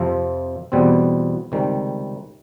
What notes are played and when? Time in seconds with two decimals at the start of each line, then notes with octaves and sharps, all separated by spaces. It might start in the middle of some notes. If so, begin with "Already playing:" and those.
Already playing: F2 C3 F3
0.72 E2 B2 G3 C4
1.52 C#2 C3 D#3 G3